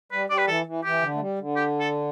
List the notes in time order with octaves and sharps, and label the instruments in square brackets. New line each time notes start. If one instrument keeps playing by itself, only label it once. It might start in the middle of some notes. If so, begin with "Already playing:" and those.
[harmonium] G3 [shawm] B4
[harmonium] G3 [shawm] D5
[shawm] B4
[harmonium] E3 [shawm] A4
[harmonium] E3
[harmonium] E3 [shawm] G4
[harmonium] D3
A3
G3
D3
[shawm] G4
A4